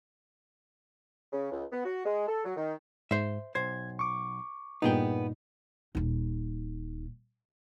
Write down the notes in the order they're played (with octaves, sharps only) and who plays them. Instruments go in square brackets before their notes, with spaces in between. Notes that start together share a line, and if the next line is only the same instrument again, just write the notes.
[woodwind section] C#3
C#2
B3
F#4
G#3
A4
F#3
D#3
[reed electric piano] G#2 [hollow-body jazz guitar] C5 E5
[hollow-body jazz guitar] B1 C5 [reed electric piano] G#6
[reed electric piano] C#6 D6
[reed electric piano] G2 A#2 D#4 [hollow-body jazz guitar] B3 G#4 G5
[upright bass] D#1 D#4